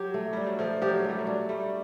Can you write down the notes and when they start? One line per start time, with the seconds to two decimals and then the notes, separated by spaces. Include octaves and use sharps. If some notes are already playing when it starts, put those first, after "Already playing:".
Already playing: F#3 G4
0.14 A3
0.33 G3 D4
0.47 F#3
0.59 F3 A3
0.82 F3 G4
0.89 F#3
1.04 A3
1.10 G3
1.19 F#3
1.27 D4
1.49 G3 A3